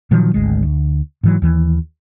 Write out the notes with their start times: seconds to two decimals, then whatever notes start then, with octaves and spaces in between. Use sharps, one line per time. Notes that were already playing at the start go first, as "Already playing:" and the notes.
0.11 A#2 D#3 F3 F#3
0.34 G#1 D2 G#3
0.63 D2
1.23 G#2 E3 F#3
1.42 D#2 E3